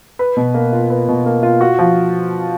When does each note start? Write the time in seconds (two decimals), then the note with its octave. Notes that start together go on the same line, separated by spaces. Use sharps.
0.19 B4
0.37 B2
0.54 A#3
0.73 F4
0.90 B4
1.08 B2
1.26 A#3
1.43 F4
1.61 F#4
1.79 F3